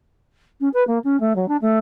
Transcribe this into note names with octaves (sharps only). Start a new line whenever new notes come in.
C#4
B4
A#3
C#4
A3
F#3
D4
A3